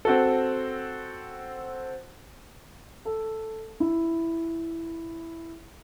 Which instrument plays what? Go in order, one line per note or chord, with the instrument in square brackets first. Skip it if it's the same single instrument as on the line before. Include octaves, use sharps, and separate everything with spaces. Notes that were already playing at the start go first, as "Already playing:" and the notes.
[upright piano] C4 F#4 A4
[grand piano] A4
E4